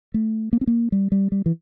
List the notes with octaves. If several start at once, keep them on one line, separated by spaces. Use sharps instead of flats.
A3
A#3
C4
A#3
G3
G3
G3
E3